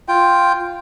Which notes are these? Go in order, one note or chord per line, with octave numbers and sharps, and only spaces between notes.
F4 G5